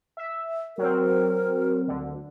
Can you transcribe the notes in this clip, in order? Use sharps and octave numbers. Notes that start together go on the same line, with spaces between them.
E5
F#3 C4 A#4
D2 D3